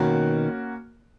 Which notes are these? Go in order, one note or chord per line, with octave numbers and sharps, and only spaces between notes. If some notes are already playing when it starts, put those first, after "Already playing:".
Already playing: B2 D#3 A#3 C#4 F#4 A#4